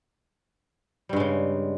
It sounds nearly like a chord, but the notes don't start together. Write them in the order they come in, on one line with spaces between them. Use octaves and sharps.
G3 G2 G#3 C#3